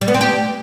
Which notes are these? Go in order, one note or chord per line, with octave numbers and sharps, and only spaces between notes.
G3
B3
C4
G4